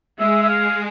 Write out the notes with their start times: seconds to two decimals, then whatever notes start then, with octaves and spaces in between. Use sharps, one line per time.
0.19 G#3 E5
0.43 E5
0.49 F5